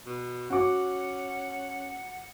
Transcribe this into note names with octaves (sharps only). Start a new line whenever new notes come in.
B2
C#4 F#4 F#5 D6